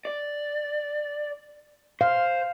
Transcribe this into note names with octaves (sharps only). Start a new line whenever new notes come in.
D5
C5 F5